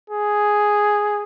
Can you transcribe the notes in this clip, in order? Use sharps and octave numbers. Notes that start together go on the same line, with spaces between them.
G#4